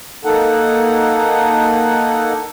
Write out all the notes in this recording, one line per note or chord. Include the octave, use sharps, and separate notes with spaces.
A#3 D#4 A4 F#5